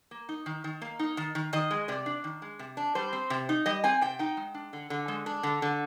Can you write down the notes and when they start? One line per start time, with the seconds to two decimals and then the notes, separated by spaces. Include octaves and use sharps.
0.11 A#3
0.29 D#4
0.46 D#3
0.64 D#3
0.82 A#3
0.99 D#4
1.17 D#3
1.35 D#3
1.53 D#3 D#5
1.71 G#3
1.88 C3 D5
2.06 D4
2.24 D#3
2.42 G#3
2.59 C3
2.77 D4
2.95 G3 C5
3.13 C4
3.30 C3
3.49 D#4
3.66 G3 D#5
3.84 C4 G#5
4.02 C3 G5
4.19 D#4 G5
4.37 G#3
4.54 D4
4.73 D3
4.90 D3
5.08 G#3
5.26 D4
5.43 D3
5.62 D3